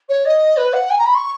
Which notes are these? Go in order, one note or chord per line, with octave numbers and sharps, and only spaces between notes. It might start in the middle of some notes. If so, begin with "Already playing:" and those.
C#5
D#5
B4
F#5
G#5
A#5
B5
C#6